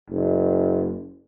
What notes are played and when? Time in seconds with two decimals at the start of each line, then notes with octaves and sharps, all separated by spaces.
0.10 F#1